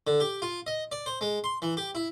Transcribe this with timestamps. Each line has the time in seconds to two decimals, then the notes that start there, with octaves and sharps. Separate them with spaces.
0.07 D3
0.20 G4
0.42 F4
0.67 D#5
0.92 D5
1.06 C5
1.21 G#3
1.44 C6
1.62 E3
1.77 G4
1.95 E4